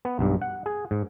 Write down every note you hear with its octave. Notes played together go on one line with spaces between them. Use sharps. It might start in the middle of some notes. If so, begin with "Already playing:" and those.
B3
B1 G2
F#5
G#4
G#2